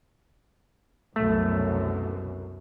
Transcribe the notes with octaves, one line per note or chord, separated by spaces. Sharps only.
C2 F#2 B2 A3